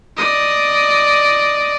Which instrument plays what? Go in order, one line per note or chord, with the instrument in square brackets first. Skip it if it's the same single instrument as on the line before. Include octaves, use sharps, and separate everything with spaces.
[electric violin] D5 D#5